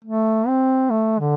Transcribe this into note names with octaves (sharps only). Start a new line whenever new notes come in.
A3
C4
A3
D3